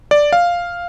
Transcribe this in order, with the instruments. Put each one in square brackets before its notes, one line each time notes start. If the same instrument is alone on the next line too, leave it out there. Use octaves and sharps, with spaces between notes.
[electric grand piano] D5
F5